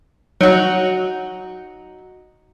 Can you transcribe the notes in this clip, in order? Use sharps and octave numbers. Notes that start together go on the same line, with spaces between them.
F#3 D#4 F#4